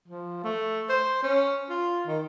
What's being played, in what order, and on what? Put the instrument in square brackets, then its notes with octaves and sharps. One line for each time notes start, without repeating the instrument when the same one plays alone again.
[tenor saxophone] F3
A3
C5
C#4
F4
D#3